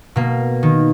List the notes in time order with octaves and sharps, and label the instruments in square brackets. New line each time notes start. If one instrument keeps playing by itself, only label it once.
[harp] B2 A#3
D#3